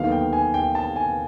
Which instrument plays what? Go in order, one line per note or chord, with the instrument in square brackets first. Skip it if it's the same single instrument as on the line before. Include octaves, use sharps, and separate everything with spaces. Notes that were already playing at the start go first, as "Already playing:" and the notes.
Already playing: [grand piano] D#2 D3 F#3 B3 D#4 F5
G5
G#5
G5
A5
G#5